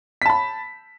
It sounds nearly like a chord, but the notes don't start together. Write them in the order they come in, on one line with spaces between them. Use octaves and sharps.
B6 A5 B5